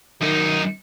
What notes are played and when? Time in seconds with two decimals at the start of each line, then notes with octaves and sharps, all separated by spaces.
0.22 F#2 D#3 D#4